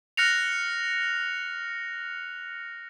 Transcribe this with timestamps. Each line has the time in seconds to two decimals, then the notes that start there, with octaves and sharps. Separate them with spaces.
0.17 F6 F#6 A#6 C#7 F7